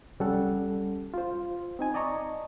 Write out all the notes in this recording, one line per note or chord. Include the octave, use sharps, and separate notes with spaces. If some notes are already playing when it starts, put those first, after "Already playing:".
C2 G3 C#4 A4 F#5
F4 C5
C4 D#4 G#5
D5 D#5 A5 A#5 C#6